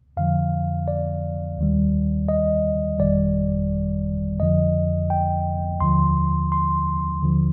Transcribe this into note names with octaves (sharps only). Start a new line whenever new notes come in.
F2 D3 F3 F5
D5
D#2 D#3 G3
D#5
G1 F2 D#3 G3 D5
F2 D3 F3 D#5
G5
D#2 D3 F3 C6
C6
D#2 D3 F3